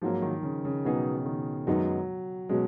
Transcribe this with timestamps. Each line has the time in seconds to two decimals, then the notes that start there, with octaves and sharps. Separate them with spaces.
0.02 G#2 F3 F#3 A#3
0.22 D#3
0.43 C#3
0.65 C#3
0.85 B2 F#3 B3 D#4 G#4
1.26 D#3
1.67 F#2 D#3 F#3 G#3 B3 D#4
2.49 B2 F#3 G#3 C#4